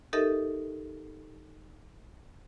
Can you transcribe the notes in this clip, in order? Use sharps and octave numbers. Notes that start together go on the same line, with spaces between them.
D#4 G4 A4 A#4 D#5 E5